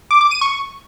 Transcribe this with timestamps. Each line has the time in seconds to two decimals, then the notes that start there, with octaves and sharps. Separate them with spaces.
0.11 D6
0.21 D6
0.31 D#7
0.41 C#6